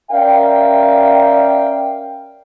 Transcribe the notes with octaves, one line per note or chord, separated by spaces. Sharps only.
C#4 A#4 D5 E5 F5 G5